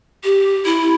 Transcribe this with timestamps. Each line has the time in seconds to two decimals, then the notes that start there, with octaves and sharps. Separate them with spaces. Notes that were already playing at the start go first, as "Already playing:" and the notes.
0.24 G4
0.65 E4